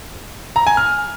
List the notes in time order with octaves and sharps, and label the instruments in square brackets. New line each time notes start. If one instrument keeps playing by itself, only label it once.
[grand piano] A#5
G#5
F6